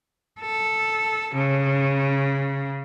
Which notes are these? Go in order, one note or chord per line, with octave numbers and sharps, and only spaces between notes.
A4
C#3